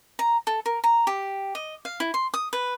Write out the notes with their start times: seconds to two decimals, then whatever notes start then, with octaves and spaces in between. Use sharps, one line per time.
0.19 A#5
0.47 A4
0.66 A#4
0.84 A#5
1.07 G4
1.55 D#5
1.85 F5
2.00 E4
2.14 C6
2.34 D#6
2.53 B4